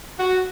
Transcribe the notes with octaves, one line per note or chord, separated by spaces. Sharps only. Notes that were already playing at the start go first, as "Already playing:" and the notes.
F#4